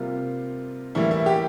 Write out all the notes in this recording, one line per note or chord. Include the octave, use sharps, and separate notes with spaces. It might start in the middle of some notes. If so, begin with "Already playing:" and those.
Already playing: C3 G3 A#3 F4
A2 E3 G3 A#3 E4
E4
G4